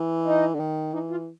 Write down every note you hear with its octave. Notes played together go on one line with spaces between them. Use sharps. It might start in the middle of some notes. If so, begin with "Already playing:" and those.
Already playing: E3
D#4
D3
D#3
E3 D#4
F4